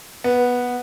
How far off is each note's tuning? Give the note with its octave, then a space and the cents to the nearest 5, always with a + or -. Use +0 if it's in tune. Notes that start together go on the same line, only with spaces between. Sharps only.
B3 -10